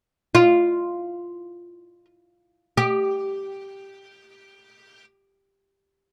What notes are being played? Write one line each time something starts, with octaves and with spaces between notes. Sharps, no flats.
F4
G4